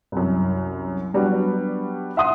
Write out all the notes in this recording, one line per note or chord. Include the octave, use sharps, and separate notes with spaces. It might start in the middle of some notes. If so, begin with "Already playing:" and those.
C2 F#2
F#3 G3 B3 D4 F#4
E5 F#5 C6 D#6